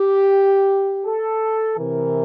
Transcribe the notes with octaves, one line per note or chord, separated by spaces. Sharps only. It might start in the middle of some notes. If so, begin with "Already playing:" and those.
Already playing: G4
A4
C3 E3 A#4